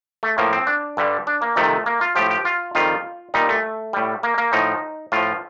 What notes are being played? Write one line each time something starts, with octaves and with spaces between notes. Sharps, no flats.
A3
A2 F3 A#3
C4
D4
G2 D3 G3
D4
A#3
F2 C3 D#3 A3
A#3
F4
A2 F3 G4
G4
F4
F2 D#3 G3 F4
A#2 G3 D#4
A3
A2 G3
A#3
A#3
A2 F3 D#4
A2 F3 F4